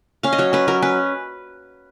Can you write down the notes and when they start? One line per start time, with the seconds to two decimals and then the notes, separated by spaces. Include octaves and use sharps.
0.23 C#4 F5
0.33 D#5
0.38 F#3 C#5
0.53 C#4 B4
0.68 F#3 A#4
0.82 C#4 B4